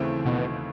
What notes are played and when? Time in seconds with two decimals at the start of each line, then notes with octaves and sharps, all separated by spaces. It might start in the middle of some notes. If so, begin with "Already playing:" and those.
Already playing: D#2 C#3 E3 A3 C4
0.25 D#2 B2